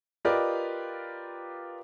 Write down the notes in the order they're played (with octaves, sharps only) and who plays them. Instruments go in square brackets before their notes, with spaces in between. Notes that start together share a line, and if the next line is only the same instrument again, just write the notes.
[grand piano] F4 G4 A#4 B4 D5 D#5